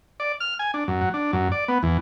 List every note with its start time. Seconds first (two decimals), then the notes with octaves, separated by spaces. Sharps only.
0.20 D5
0.40 F6
0.59 G#5
0.74 D4
0.88 F#2
1.01 F#3
1.14 D4
1.33 F#2
1.52 D5
1.68 B3
1.83 E2